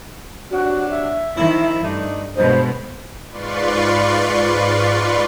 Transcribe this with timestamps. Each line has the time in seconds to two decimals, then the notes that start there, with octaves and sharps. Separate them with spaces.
0.51 C3 F#3 D4 F#4
0.90 E5
1.37 D#3 F3 E4
1.84 G2 A3 D4 D#4
2.36 D2 G2 B2 F3 G#3 C5 D#5
3.30 G#2 F4 B4 D5 C6 C#6